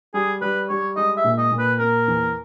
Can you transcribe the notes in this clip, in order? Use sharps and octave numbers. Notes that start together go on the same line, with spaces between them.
G3 G#4
G3 B4
G3 C#5
G#3 D#5
E5
A#2
D#5
A#2
B4
A#3 A#4
E2